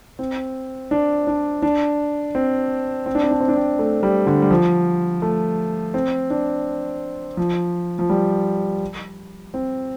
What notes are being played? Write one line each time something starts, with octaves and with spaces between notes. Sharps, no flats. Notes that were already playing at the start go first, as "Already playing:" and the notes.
C4
D4
D4
D4
C4
C4
D4
C4
D4
C4
D4
C4
A3
G3
D3
G3
F3
A3
C4
D4
F3
F3
G3
C4